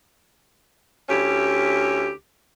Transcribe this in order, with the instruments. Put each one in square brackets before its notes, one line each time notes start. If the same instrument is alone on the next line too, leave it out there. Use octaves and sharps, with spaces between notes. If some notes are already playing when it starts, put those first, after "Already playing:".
[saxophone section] D2 C#4 E4 G4